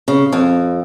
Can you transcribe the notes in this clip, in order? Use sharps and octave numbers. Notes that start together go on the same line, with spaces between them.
C#3
F2